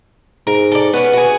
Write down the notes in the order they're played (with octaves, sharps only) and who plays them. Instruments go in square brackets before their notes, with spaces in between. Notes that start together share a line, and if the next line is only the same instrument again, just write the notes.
[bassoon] G#2 [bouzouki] A#4
[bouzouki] A4 D5
[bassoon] B3 [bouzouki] C#4 B4
[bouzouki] F#4 G#4